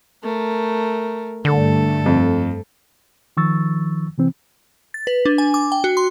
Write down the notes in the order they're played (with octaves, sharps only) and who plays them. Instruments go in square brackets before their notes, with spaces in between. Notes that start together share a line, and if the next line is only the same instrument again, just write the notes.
[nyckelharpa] A3 A#4
[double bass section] G2 A3 [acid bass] D3 [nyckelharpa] A4
[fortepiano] F2
[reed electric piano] D#3 F3 C#6 E6 A6
C3 E3 C4
[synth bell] A6
B4
D4
G#5
D6
G5
F#4
C6